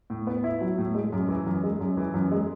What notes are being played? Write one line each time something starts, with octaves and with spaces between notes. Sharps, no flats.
A2
B3
E4
F#3
A2
G#3
F#2
E3
F#2
G#3
F#2
E3
F#2
G#3